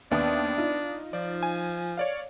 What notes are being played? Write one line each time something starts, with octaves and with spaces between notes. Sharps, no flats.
D#2 B3 D4 D5 E5 D#6
D#4 F4
F3 D5
G#5
C#5 D5 F5